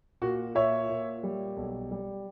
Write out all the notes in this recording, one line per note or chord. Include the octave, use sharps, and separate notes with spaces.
A#2 F#4
A#2 C#5 E5
A#2
G3
B1
G3